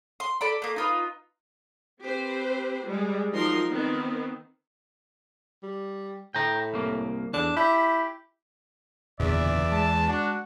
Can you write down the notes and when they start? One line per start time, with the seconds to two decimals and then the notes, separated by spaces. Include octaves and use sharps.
0.20 C6
0.41 A4 D5 B5
0.62 A3 A#3
0.76 D#4 F4 B4
2.00 C4 G4 B4 C5
2.85 G3 G#3
3.32 F3 F#3 D#4 A#4 C6
3.70 D#3 B3 C4
5.63 G3
6.35 A2 G5 A#5
6.74 C2 A#3
7.34 E2 D4
7.57 E4 G4
9.20 F#1 E2 A#2 D3 D5 E5
9.72 G#3 A5
10.08 D4 F#4